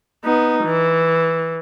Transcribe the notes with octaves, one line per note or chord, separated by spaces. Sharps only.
B3 D#4
E3